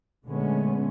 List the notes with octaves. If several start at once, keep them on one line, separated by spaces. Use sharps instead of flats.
A#2 D3 G#3 A3 B3 C#4